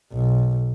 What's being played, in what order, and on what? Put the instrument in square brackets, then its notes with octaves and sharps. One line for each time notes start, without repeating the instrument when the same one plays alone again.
[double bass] B1